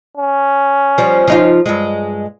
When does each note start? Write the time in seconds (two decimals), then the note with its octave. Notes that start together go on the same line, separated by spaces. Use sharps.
0.17 C#4
0.98 F3 G3
1.28 F3 D#4 F4
1.66 G2 G#3